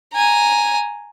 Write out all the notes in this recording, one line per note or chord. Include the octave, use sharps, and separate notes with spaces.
G#5 A#5